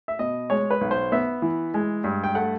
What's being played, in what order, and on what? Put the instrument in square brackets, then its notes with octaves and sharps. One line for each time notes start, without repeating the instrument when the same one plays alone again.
[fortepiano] E5
B2 D#5
G#3 C#5
B4
B1
C5
B3 E5
E3
G#3
G2
G5
A3 F#5